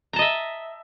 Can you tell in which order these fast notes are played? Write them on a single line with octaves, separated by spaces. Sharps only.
A#5 A5 D#5 E5